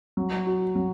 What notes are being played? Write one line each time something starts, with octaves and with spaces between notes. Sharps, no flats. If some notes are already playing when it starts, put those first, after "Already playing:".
F#3
F#4
F#3